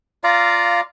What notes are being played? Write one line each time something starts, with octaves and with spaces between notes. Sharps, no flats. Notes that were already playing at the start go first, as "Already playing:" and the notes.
F4 D5 F5 A#5